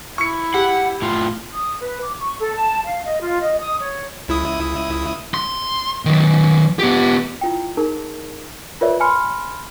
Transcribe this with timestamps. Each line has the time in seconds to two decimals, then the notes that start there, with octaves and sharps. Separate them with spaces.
0.18 E4 C#6 C#7
0.54 G4 F#5
1.02 A2 F4
1.51 D#6
1.80 B4
2.02 D6
2.18 C#6
2.39 A4
2.55 A5
2.84 F5
3.06 D#5
3.20 F4
3.40 D#5
3.60 D#6
3.79 C#5
4.28 C#2 E4 D#6
5.34 C6
6.05 D#3 F#3
6.79 B3 G4
7.41 E4 F4 G5
7.77 D#4 G#4 A#4 A5
8.81 F4 A#4 B4 C#5 D5 E5
9.00 G#5 A5 B5 C6 F6 C#7